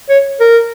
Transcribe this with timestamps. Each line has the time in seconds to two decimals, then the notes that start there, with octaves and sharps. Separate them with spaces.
0.09 C#5
0.40 A#4